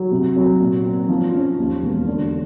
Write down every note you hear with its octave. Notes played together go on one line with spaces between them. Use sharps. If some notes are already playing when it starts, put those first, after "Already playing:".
Already playing: F#3
C3
F#3
A#2
C4
F3
C#4
D#2
E1
D3